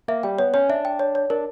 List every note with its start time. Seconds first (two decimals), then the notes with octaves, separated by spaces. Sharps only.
0.08 A#3 E5
0.23 G3 G5
0.39 B3 C#5
0.54 C#4 C#5
0.69 D4 E5
0.85 G5
0.99 C#5
1.15 C#5
1.30 D4 A#4